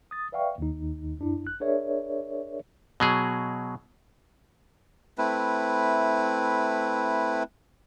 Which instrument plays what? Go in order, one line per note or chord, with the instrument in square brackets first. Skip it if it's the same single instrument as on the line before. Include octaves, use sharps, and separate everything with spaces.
[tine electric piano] D#6 A6
B4 D5 E5 F5 G5 C#6
D#2 D#3 D#4
F#2 D4 E4
G#1 F#6
D4 G#4 A#4 C#5 D5 E5
[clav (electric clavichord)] B2 F#3 G#4
[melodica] A3 C4 E4 B4